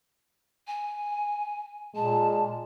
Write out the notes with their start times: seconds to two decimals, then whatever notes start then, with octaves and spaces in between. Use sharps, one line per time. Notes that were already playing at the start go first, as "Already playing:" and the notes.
0.67 G#5
1.95 A#2 G#3 A5